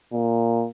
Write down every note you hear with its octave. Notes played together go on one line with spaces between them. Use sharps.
A#2